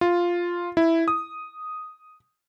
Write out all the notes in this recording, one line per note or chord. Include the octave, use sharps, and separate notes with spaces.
F4
E4
D#6